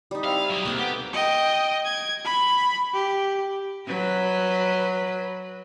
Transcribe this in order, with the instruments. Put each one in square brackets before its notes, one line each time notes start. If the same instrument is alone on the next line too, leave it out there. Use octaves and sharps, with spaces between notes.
[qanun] G3 D#4
[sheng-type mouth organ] C4 E4 [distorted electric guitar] F5
[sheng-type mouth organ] D#6
[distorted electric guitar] F#3 E4
[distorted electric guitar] C2 [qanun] A#3 C4 A4
[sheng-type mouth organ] B3 F#5 D#6 [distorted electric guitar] G4
[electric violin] D#5 G5
G#6
B5
G4
[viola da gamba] F#3 B4